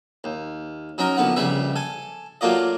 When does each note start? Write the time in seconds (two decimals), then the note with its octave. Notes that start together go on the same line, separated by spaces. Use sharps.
0.24 D#2
0.98 F#3 C#4 D#4 A#4
1.17 A#1 D3 B3 F#5
1.36 A#1 C#3 G3 B4 E5
1.76 A4 G#5
2.41 F#3 A3 A#3 F4 D5 D#5